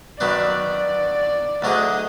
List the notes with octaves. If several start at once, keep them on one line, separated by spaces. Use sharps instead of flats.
F#2 D#3 F#3 B3 D4 D5
D2 D3 F#3 D4 G#4 D#5